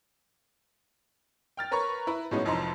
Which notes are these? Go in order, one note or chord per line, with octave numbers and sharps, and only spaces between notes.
G5 F6 A6
A#4 B4 C#5 A#5 C#6
E4 B4
A2 F#3 G#3 B3 C#4 D#4
F1 F2 E3 D#4 A#5 C6